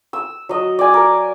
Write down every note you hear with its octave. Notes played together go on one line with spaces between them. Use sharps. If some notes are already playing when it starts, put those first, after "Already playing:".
E6
F#3 D#5
D5 G#5
A#4